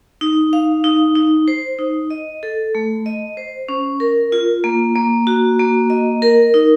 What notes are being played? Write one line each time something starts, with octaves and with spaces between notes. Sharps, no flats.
D#4
F5
D#4
D#4
C5
D#4
D#5
A4
A3
D#5
C5
C#4
A#4
F4
A#3
A#3
F#4
A#3
D#5
A#4
D#4